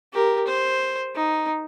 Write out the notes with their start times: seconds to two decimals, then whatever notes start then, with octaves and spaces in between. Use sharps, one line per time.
0.13 G4 A#4
0.47 C5
1.15 D#4